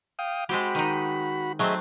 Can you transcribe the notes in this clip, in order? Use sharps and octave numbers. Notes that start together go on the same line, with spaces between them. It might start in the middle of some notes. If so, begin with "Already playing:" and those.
F5 G5 D#6
G#3 C4 F#4 G4 B5
D#3 D#4
F#3 A3 C4 G#4 D#5 E5